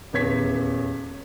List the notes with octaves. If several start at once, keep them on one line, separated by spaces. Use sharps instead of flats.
D#1 E2 C#5 G#6 B6